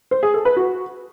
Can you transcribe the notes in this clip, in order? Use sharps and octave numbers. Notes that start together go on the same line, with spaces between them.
C5
G#4
A4
B4
F#4